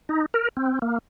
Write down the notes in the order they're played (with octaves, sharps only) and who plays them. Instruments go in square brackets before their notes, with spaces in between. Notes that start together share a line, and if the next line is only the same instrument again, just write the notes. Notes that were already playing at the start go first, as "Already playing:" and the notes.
[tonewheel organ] D#4
A#4
C4
A#3